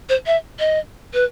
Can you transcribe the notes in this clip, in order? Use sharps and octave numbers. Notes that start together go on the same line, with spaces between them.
C5
E5
D#5
B4